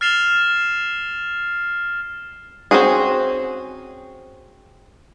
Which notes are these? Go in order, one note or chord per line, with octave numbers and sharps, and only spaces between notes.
F6 A6 C7 E7 F7 G7
C4 C#4 F#4 G#4